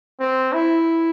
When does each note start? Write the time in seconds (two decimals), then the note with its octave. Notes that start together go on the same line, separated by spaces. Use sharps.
0.20 C4
0.53 E4